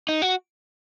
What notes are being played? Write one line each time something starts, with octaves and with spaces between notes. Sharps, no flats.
D#4
F#4